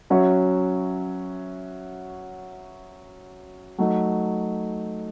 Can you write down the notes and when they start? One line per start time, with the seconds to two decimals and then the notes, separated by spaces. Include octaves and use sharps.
0.10 F#3 C#4 F#4 C#5 E5
3.78 F#3 A3 D#4